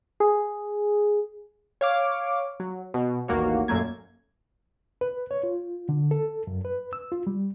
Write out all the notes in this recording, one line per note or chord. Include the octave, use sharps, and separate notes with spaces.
G#4
C#5 F5 D6
F#3
B2
A1 D#2 A#3 F#4 C#5
F#2 A#2 A3 A#3 G#6
B4
C#5
F4
D3
A4
F#2
B4
E6
F4
G3